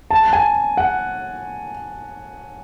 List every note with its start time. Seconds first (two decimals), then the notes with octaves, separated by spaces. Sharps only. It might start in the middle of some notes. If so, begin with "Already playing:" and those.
0.11 A5
0.33 G#5
0.77 F#5